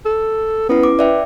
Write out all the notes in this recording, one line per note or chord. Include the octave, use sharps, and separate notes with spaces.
A4
B3 C#4 E4 B4
D6
B4 D5 E5 G5